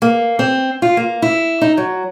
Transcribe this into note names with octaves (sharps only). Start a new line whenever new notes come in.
A#3
C4
F4
A#3
E4
D#4
F#3